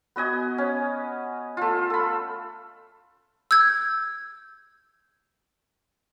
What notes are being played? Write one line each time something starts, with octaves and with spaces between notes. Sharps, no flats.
B3 F#4 D#5 G#5
C#4
A3 F4
A4 B5
E6 G6 G#6